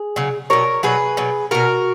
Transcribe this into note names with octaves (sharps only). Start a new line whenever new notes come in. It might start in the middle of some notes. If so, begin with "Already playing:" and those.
Already playing: G#4
C#3 F#3
B2 F#3 A#4 C#5
B2 F#3 G#4 B4
B2 F#3
B2 F#3 F#4 A#4